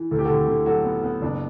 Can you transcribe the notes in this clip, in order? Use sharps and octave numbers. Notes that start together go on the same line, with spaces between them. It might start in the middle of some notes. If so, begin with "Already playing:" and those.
Already playing: E3
D2 A4
G4
F#4 A4
D3
D3
F#3 F#4 A4
B3
B3
F#1 D4